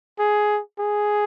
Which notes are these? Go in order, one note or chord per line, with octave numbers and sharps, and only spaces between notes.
G#4
G#4